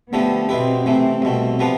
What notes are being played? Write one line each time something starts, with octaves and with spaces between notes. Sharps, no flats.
D3 F3 A3 B3 D4 G4
B2 B3 C4 E4 G4
C3 E3 A3 C4
C2 B2 A3 C4
C3 F3 B3 D4 F4